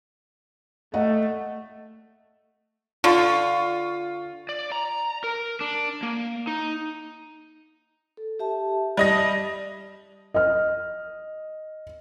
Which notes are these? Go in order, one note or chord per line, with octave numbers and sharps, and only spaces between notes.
A3 D#5 F#5
D3 F4 C#6
D5
A#5
A#4
D4
A#3
D#4
A4
G4 E5 A5
G3 D#5 A#6
D#5 F6